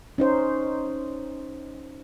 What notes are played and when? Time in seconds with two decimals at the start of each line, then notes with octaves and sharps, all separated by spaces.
0.18 C#4 D#4 C5